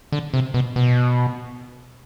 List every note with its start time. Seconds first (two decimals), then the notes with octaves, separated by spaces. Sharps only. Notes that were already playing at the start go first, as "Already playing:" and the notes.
0.12 D3
0.34 C3
0.54 B2
0.76 B2